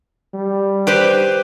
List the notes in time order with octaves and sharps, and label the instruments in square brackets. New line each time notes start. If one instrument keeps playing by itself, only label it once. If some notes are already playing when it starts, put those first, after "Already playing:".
[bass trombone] G3
[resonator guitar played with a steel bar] G4 B4 C5